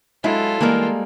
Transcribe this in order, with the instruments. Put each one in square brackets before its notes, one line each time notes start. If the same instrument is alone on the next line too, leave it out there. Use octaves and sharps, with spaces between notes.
[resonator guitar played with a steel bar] F#3 E4 [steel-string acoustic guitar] G#3 [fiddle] F4 A4
[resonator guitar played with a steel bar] E3 A#4 [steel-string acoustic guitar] G3 G#3 A#3